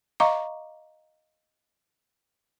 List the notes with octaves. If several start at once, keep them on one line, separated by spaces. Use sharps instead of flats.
D#5 F5 A#5 C#6 D6